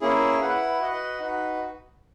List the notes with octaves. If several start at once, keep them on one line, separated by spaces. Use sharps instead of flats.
A#3 C#4 E4 G#4
E4 B4 F#5
F#4 B4 D#5 F#5
D#4 F#4 B4